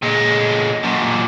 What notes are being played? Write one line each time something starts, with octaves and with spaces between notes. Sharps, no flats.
A#2 G#3
F#2 A#2